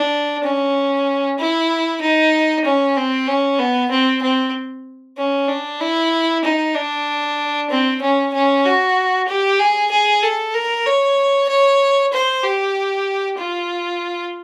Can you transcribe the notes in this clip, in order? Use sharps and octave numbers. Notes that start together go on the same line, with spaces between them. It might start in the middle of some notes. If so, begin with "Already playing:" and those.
Already playing: D4
C#4
E4
D#4
C#4
C4
C#4
B3
C4
C4
C#4
D4
E4
D#4
D4
C4
C#4
C#4
F#4
G4
G#4
G#4
A4
A#4
C#5
C#5
C5
G4
F4